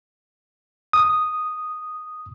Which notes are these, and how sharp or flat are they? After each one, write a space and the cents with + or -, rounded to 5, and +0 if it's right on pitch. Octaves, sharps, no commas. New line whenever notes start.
D#6 -5